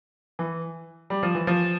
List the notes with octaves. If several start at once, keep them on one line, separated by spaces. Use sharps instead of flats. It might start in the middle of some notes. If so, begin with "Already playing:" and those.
E3
G3
F3
E3
F3